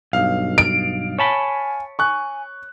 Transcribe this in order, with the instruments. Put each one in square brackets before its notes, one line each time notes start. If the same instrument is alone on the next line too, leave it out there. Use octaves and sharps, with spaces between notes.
[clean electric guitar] B1 G2 [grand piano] F5
[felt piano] D7
[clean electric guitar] C#5 A5 B5 [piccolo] G#5
[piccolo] G#5 [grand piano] C#6 F#6